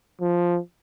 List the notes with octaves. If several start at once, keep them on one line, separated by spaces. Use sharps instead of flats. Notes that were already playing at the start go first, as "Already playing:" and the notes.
F3